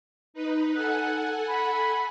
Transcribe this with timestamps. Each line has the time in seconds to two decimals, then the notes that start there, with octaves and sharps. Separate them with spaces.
0.34 D#4 B4
0.74 A4 F#5 G#5 F#6
1.48 B5